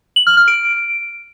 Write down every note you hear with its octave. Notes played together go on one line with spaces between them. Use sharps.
F#7
F6
F6
D7